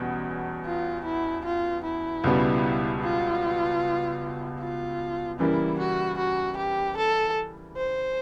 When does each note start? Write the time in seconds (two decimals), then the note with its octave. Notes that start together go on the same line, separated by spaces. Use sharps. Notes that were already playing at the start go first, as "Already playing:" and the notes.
Already playing: E2 B2 G3 C#4
0.65 F4
1.05 E4
1.45 F4
1.84 E4
2.24 C#2 B2 G3 B3
3.02 F4
4.60 F4
5.39 C#3 E3 G3 A#3 E4
5.79 F#4
6.18 F#4
6.57 G4
6.98 A4
7.76 C5